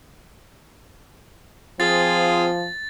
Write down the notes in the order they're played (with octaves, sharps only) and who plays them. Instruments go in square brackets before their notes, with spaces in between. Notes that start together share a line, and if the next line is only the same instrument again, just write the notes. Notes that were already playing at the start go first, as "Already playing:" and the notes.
[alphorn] F3 [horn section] C4 G#4 [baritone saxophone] F4 [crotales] A6